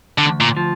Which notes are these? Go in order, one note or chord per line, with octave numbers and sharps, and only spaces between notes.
D3
D2
A#2
F3